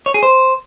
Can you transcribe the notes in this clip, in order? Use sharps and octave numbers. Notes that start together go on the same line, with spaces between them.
C#5
G#4
C5